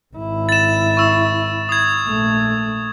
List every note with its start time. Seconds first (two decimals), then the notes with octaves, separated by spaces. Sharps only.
0.14 G#1 E4
0.49 A6 E7
0.97 C#6 E6
1.69 D#6 G#6
2.06 A#1 A3